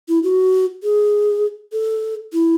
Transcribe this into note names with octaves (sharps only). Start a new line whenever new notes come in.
E4
F#4
G#4
A4
E4